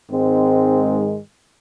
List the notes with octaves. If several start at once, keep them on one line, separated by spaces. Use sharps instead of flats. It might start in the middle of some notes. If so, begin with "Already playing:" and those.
G#2 D#3 G#3 C4